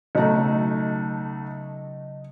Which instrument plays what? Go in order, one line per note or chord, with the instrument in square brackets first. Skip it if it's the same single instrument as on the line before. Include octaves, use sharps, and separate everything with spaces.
[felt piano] B1 A3 [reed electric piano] C#3 F#3 A#5 [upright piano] D#5